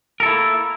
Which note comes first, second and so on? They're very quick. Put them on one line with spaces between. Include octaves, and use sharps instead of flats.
A#4 A4 E4 A#3